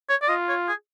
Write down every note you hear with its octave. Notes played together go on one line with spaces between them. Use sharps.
C#5
D5
F4 D#5
C#5
G#4